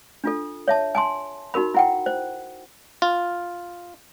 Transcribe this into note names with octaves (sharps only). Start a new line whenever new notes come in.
D4 F4 A4
C#5 E5 A5
G#5 A5 C6
D#4 F#4 A#4 B5
E4 F#5 G5
C5
F4